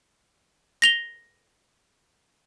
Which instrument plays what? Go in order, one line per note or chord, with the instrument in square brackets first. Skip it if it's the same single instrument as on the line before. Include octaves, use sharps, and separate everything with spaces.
[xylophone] A#6 F7 G7